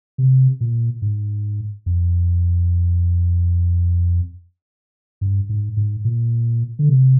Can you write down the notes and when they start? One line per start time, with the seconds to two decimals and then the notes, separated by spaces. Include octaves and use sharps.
0.18 C3
0.61 A#2
1.02 G#2
1.86 F2
5.21 G2
5.49 G#2
5.77 G#2
6.05 A#2
6.79 D3
6.89 C3